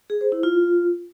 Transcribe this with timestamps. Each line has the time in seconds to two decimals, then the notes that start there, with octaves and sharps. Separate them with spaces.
0.10 G#4
0.21 C5
0.32 E4
0.43 F4